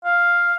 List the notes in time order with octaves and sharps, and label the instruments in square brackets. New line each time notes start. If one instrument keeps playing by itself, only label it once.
[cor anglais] F5